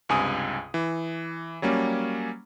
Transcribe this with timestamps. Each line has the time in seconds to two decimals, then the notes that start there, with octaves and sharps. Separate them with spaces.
0.09 C#2 G2 C3 G#5 D#6
0.74 E3
1.62 F#3 G3 A#3 C#4